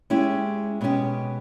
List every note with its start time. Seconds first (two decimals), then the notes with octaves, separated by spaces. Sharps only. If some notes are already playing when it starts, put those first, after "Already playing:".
0.10 G#3 C#4 E4 G4
0.81 B2 G#3 C#4 G4